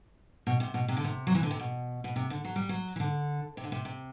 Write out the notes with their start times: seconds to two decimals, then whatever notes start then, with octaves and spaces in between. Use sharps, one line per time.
0.47 B2
0.60 C3
0.74 B2
0.88 C3
0.97 D3
1.04 C3
1.27 F#3
1.35 E3
1.43 D3
1.51 C3
1.60 B2
2.04 B2
2.16 C3
2.30 D3
2.44 F#3
2.56 G3
2.69 F#3
2.96 E3
3.00 D3
3.57 C3
3.64 D3
3.72 C3
3.85 C3